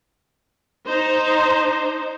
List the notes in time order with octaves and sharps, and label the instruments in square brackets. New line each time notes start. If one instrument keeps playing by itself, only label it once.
[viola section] D#4 C5